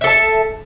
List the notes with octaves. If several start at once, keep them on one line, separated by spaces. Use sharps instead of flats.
A4 E5 A5